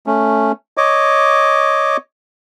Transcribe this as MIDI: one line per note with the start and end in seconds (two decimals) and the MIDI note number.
0.07 0.52 57
0.07 0.52 61
0.77 1.97 73
0.77 1.97 75
0.77 1.97 86